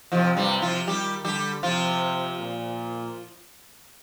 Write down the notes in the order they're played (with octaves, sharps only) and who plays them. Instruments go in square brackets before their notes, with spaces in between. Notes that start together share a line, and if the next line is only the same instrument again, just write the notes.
[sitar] F2 F3 [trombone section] C3
[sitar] G2 G3
F3 F4
[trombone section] D#3 [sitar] G3 G4
[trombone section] D3 [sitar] G3 G4
[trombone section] C3 [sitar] F3 F4
[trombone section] A#2